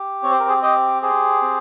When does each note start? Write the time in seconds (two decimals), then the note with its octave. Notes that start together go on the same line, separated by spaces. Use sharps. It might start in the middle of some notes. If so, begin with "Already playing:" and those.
Already playing: G4
0.23 C4 C#5
0.31 C5
0.40 A#4
0.48 G#4 C5
0.62 G4 C5 D#5
1.02 G4 G#4 C5
1.42 C4